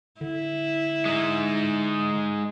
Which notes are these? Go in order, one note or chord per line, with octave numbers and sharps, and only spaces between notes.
D3 E4
G#3 D#4